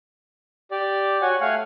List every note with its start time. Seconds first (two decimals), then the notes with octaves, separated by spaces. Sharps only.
0.71 G4 D5
1.22 F#4 C#5 F#5 G#5
1.41 A3 F5 F#5 G#5